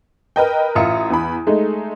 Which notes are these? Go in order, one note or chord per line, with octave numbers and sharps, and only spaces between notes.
A#4 B4 D#5 G5
A1 F4 E5 A#5 D#6 C#7
E2 B5
G#3 A3 D#4